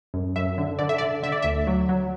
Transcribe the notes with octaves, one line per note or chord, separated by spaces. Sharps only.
F#2
F#2 E5
D3
D3 D5
E5
D5
D3
D3 E5
D5
D2 E5
F#3
F#3